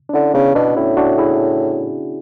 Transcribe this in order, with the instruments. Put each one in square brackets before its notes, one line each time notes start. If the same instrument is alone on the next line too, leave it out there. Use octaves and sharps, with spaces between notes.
[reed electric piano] D4
[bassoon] D3 [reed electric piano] C#4 E4
[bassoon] C#3 [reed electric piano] B3 D4
[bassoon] B2 [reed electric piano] D4 F#4
[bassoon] A2 [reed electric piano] C#4 E4
[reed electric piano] D4 F#4
E4 G#4